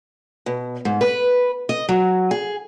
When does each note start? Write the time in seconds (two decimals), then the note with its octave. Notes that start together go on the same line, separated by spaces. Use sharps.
0.46 B2
0.85 G#2
1.01 B4
1.69 D#5
1.89 F#3
2.31 G#4